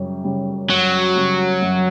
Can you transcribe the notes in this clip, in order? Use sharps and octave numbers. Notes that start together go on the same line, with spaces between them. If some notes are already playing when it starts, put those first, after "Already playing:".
Already playing: F#2 C#3 G3
C#3 G3
F#2 F#3
C#3 G3
F#2